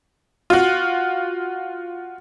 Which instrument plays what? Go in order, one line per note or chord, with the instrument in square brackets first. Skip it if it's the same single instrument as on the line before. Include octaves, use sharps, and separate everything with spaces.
[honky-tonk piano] F4 F#4